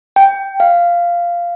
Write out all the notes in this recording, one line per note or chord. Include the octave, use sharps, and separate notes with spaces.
G5
F5